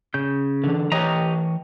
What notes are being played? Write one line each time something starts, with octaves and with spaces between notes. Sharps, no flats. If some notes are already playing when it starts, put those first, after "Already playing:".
C#3 G6
D3 E3
E3 G4 C#5 D#5 G5 A#5